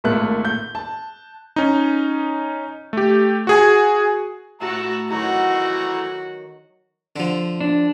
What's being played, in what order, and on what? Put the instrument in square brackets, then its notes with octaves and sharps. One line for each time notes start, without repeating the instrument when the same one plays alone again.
[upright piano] G#1 A#2 A3 A4 F#6
G6
A5
[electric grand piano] C#4 D#4
A3 G4
F#4 G#4 G#5
[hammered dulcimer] A2 [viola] F#4 [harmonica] E5 A5 A#5
[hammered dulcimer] D#3 F#3 [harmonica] E3 A3 A#5 [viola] F#4
[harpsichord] D3 F3
[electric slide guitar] D4